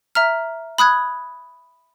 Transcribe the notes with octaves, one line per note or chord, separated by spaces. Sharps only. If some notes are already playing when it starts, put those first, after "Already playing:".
E5 A#5 F6
B5 D#6 F#6 G#6